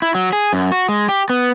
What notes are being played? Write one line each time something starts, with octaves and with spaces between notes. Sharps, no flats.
E4
F#3
G#4
F#2
F#4
G#3
G4
B3